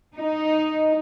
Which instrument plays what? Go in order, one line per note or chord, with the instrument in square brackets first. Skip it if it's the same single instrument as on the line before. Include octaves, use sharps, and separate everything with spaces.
[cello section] D#4